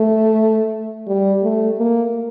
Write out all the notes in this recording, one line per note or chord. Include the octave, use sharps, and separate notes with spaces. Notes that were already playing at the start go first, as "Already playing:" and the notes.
Already playing: A3
G3
A3
A#3